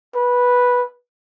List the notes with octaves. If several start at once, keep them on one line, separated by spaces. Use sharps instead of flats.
B4